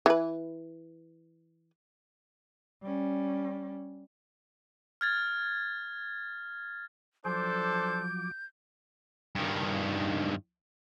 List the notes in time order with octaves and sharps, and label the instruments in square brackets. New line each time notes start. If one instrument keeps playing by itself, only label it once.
[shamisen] E3 B4
[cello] G3 C#4
[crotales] F6 G#6 A6
[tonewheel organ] F3 F#3 D6 [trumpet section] D4 A4 [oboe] C5 [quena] G6
[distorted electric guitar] G2 D#3